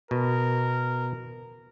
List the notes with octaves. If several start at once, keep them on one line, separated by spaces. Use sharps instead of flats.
B2 A#4